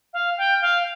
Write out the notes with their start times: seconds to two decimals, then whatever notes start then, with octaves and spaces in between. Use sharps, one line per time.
0.13 F5
0.38 G5
0.61 F5